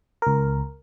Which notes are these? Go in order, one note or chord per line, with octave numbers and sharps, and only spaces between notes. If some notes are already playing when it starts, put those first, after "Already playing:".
C#2 A#4